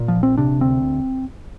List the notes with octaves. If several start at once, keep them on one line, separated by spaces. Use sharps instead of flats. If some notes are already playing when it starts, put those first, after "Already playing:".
Already playing: A#2
F3
A#1
C4
C3 D4
D2 C4